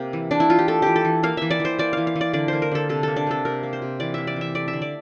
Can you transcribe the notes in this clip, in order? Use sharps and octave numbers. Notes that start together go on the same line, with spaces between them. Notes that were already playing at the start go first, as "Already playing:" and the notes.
Already playing: C3 A#3 G4
E3
A#3 D4
E4
E3 F4
G4
A3 A4
E3 G4
A4
E3
A#3 F5
E3 E5
D5
E3
C5
A#3 D5
E3 F5
F5
E3
D5
D3 D5
A#3 C5
A#4
D3 A4
C3 A4
A#3 A4
D4
C3 A4
C3 A#4
A#3
C5
C3
E3 D5
A#3 E5
D5
E3 E5
A3 D5
E5
D3
D5